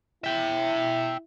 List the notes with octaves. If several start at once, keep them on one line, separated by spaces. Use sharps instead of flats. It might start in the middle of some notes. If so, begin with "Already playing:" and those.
E4 E5 G5